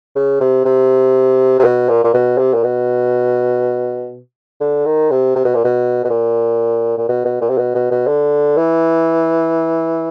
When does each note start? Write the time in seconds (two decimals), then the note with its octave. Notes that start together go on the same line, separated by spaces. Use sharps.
0.16 C#3
0.40 C3
0.65 C3
1.59 C3
1.64 B2
1.89 A#2
2.04 A#2
2.14 B2
2.38 C3
2.54 A#2
2.63 B2
4.60 D3
4.86 D#3
5.11 C3
5.36 C3
5.45 B2
5.55 A#2
5.64 B2
6.04 B2
6.10 A#2
6.98 A#2
7.08 B2
7.25 B2
7.41 A#2
7.50 C3
7.58 B2
7.75 B2
7.91 B2
8.07 D3
8.57 E3